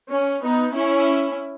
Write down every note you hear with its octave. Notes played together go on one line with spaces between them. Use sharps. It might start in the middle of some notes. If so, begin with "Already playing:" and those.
C#4
B3 D#4
C#4 E4